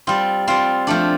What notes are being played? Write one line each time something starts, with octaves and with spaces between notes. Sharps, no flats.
G3 C4 F4
G3 C4 F4
F3 A3 D4